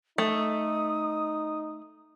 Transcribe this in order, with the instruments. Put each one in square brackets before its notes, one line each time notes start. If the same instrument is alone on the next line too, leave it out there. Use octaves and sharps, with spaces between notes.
[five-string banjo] A3 [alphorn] D#4 [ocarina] D#6